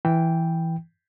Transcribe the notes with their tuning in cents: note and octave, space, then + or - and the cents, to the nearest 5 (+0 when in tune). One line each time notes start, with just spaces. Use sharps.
E3 +0 G5 +0